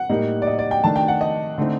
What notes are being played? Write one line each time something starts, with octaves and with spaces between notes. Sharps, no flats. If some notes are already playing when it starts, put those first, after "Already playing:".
Already playing: F#5
A2 G3 A#3 D#4
D5
D#5
D5
G5
D#3 A3 D4 A5
G5
F#5
D#5
D3 A3 C4 D#4